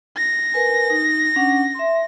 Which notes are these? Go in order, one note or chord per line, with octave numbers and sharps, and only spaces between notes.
A#6
A#4 B4 G#5
D#4
C#4 D4 F#5
E5 C6